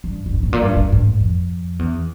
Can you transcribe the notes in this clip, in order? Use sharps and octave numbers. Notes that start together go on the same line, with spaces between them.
G2
G2
G#2
A2
A#2
G2
G2
G#2
F2
E2